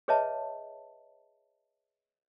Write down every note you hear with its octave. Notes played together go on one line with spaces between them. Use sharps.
G#4 B4 C#5 D#5 E5 A5